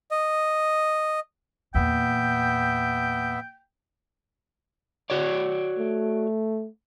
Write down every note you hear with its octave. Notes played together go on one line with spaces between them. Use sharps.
D#5
E2 A#2 B3 E5 G5
F#4 C#5 D5
A3